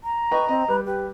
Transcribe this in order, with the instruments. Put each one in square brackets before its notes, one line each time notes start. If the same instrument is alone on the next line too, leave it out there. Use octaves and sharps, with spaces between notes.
[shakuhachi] A#5
[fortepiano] B4 D#5 G5 [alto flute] C#6
[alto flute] C4 [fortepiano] D#5
[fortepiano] G3 [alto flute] B4
[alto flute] G4 [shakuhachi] B4